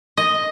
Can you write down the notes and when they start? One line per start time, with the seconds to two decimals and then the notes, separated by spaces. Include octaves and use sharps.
0.17 D#5